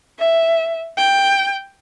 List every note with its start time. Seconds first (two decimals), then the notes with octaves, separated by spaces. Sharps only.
0.20 E5
0.98 G5